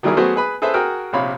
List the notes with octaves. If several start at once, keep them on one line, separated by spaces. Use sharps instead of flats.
D#3 F#3 G3 E4 G#4 A#4
F#3 A3 B3 F#4 G#4 C5
G#4 B4 B5
G#4 A4 B4 C5 E5
F#4 G#4 A#4 G5 F6
A#1 C3 C#5 F5 B5